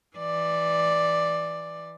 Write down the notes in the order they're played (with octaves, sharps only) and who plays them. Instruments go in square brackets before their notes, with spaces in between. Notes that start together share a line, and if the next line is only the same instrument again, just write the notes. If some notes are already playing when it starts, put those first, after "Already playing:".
[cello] E3 D5